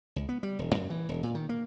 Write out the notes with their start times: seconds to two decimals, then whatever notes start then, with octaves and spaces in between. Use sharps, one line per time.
0.16 C#2
0.29 B3
0.43 G3
0.59 E1
0.75 F#2
0.90 E3
1.09 E1
1.23 A#2
1.35 D#3
1.49 A#3